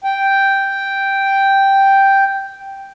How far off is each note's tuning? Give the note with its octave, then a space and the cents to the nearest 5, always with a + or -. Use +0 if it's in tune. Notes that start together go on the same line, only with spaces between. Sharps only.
G5 +0